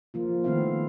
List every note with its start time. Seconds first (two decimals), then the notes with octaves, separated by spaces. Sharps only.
0.14 F3 A#3 F4
0.44 D#3 A3 B3 C4 E4 F5